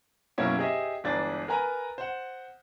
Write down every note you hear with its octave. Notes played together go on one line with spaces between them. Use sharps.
F#2 B2 A#3 C#4 E4
G4 G#4 C5 D#5 E5
G1 E3 G#3 D4 G#4 A6
A#4 B4 G#5 A#5
C5 F#5